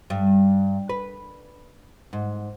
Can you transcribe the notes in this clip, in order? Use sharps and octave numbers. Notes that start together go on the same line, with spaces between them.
G2
B4
G#2